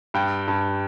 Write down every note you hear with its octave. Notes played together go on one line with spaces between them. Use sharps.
G2 G5
G2